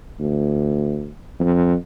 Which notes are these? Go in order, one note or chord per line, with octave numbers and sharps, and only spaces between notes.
D2
F2